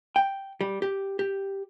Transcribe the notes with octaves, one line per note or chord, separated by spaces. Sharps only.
G5
G3
G4
G4